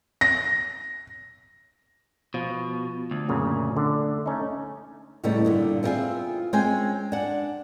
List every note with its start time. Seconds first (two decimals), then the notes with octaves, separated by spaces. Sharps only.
0.21 A#6
2.34 B2 F3
3.11 D2
3.28 F#2 A#2 C#3
3.77 D3
4.26 A3 C#4 D#4
5.24 A2 C#3 G3 A3 B3 D#4
5.45 G2 A#2 D3
5.83 B3 C4 E4 F4 G#4 E5
6.53 G#3 C4 C#4 G5 G#5
7.12 D4 F#5